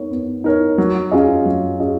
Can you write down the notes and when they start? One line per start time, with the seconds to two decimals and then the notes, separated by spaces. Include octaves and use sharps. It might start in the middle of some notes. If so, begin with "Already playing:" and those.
Already playing: B3 D#4 A#4 C#5
0.11 B3
0.44 D#4 A#4 C#5
0.78 F#3
1.11 C#4 F4 G#4 D#5
1.46 F#3
1.79 C#4 F4 G#4 D#5